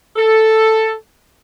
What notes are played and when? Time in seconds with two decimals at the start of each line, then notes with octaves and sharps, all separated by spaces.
0.16 A4